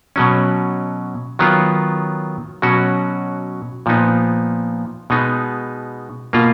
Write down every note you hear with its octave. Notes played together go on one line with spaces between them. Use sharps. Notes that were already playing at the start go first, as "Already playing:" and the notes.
B2 F#3 C#4
D#3 F#3 B3 F4
B2 F#3 C#4 F#4
A#2 F3 B3 D#4
B2 G#3 B3 D#4
B2 A#3 F4